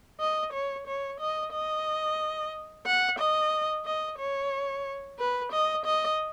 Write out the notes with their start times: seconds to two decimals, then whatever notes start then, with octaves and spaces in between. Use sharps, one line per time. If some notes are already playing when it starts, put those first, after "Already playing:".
0.20 D#5
0.53 C#5
0.87 C#5
1.20 D#5
1.53 D#5
2.86 F#5
3.19 D#5
3.85 D#5
4.18 C#5
5.19 B4
5.52 D#5
5.85 D#5